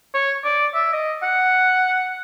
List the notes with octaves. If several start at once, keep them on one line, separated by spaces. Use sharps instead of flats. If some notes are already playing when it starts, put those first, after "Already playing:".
C#5
D5
E5
D#5
F#5